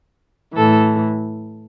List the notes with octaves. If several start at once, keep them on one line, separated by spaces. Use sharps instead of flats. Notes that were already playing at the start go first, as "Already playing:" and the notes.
A2 E3 A4